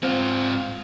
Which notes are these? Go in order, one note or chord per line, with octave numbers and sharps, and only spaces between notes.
G#2 C4 F4